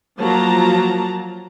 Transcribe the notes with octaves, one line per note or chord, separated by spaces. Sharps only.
F3 F#3 A#3 A5 A#5